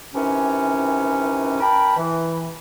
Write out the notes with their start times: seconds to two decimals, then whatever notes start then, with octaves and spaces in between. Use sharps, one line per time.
0.14 C3 D#3 E3 C#4
1.61 A#4 G5 A5 B5
1.97 E3